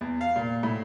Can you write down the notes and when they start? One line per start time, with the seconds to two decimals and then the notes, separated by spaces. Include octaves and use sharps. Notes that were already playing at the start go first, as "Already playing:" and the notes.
0.01 E2
0.21 F5
0.36 A#2
0.63 A2